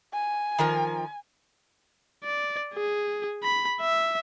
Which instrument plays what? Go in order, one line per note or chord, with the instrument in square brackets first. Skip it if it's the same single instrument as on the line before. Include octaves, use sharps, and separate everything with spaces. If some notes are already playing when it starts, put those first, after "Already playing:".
[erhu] G#5
[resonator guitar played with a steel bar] D#3 F3 A#4
[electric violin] D5
G#4
B5
E5